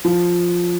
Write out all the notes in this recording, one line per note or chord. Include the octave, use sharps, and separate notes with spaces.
F3